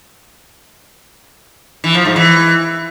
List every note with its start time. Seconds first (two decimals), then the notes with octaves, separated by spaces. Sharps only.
1.84 E3
1.94 F3
2.05 G#2
2.16 E3